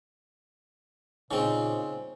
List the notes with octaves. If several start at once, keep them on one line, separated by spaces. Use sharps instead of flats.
A#2 C#3 C4 D#4 C5